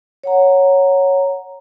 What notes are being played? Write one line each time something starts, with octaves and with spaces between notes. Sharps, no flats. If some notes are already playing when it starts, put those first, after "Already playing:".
C#5 F#5 A#5